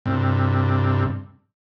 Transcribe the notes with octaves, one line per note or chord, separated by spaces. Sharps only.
G2 C3